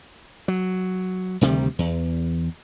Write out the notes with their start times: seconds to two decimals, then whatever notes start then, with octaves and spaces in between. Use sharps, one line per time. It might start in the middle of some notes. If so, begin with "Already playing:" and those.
0.48 F#3
1.41 D2 C3 D#3 G3
1.79 E2